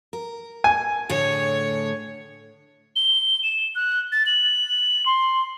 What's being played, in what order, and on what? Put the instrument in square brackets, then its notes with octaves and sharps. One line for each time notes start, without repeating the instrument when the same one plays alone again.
[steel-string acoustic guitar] A#4
[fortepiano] G#5
[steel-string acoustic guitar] A2 D3 G#4 [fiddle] C#5
[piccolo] G7
E7
F#6
A6
F#7
C6